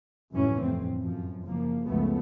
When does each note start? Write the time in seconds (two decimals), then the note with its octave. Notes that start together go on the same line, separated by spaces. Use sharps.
0.32 F1 C#2 F#2 A2 E3 C#4
0.62 G1 F2 A2 C4
1.00 F#2 F3
1.45 F#1 F3 A#3
1.86 C#2 F#2 F3 A3 B3